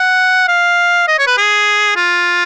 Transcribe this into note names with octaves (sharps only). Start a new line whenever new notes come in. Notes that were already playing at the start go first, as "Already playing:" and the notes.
Already playing: F#5
F5
D#5
C#5
B4
G#4
F4